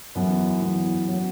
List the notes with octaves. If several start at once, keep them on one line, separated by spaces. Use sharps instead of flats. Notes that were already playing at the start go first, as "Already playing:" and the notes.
F#2 E3 B3 E4
F#2 E3 B3 E4
F#3 B3